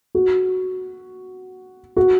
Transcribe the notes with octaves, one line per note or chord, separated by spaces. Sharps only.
F#4
F#4